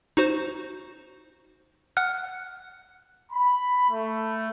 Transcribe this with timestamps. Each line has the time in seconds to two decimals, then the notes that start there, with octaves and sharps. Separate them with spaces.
0.17 D#4 F#4 C5
1.97 F#5 F6 F#6
3.31 B5
3.89 A3